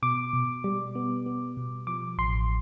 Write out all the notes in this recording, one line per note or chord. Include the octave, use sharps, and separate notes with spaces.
B2 D6
B2
G3
B3
B3
B2
F3 D6
A1 C6